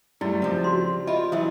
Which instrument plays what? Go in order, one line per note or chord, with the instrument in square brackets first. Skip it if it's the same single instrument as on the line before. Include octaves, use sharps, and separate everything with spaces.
[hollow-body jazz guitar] F#2 [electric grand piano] G3 A3 [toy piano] E4 [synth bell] D5
[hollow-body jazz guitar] C#2 F3 [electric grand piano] C4 G4
[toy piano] F#4 C6
[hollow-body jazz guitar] F4 [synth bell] D#5 E5 B5
[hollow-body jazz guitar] E3 F#3 [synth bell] E4 E5